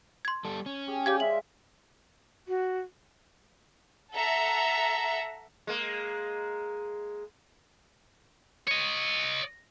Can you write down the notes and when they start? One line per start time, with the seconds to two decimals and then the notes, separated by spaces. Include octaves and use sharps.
0.25 C6 G#6
0.45 G3 A4
0.66 C#4
0.87 G4 G#4
1.06 G4 C#5 D5 F5 G#6
1.20 G#3 F4 E5 F#7
2.48 F#4
4.13 A4 E5 F#5 A#5
5.67 G#3 A#3
8.68 C#5 D#5